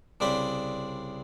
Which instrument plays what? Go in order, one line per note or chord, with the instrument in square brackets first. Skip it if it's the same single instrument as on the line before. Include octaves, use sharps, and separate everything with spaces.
[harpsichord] C2 C#3 C4 D4 D5 B5